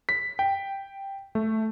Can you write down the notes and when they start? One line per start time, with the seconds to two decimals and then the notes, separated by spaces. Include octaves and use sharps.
0.09 B6
0.39 G5
1.35 A3